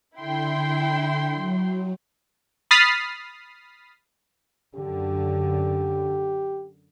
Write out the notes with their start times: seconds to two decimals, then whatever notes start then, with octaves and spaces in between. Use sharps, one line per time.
0.18 D3 E4 G5 C6
1.35 F#3
2.71 B5 D#6 F6 A6 B6 C7
4.75 F#2 D3 G4